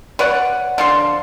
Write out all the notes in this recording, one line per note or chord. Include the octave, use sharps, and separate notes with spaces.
B4 C#5 D5 F#5
D3 F3 C6